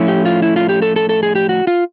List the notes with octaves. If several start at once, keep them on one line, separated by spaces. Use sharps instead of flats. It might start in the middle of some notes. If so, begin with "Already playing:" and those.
Already playing: A2 F3 A3 C#4 E4
G4
F4
E4
F4
G4
A4
A4
A4
G#4
G4
F#4
F4